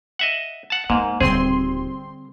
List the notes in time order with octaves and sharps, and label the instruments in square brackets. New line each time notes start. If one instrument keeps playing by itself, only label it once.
[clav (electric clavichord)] D#5 E5 F#5
F#5 A5
[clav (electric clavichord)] G#2 [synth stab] A#3 [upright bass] B3
[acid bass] D#1 [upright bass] D3 G3 [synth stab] C4 C6 [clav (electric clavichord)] G#4